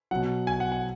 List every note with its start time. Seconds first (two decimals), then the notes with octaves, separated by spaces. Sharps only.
0.11 B2 F#3 F#5
0.47 G#5
0.60 F#5
0.72 F#5